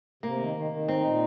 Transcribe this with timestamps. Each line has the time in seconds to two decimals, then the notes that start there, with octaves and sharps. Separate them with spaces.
0.23 C3 A#3
0.39 D#3
0.55 D#3
0.71 D#3
0.88 C4 D#4
1.04 A#2